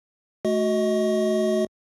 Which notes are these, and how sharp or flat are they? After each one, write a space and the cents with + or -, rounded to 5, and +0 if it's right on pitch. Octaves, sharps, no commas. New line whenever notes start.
A3 -20 F#4 +0 D#5 +20